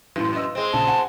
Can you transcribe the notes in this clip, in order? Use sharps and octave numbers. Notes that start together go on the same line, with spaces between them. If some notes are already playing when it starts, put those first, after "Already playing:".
F#2 A2 E3
B4 D#5 E6
G#3 C4
A#1 C#3 A5
F#5 G#5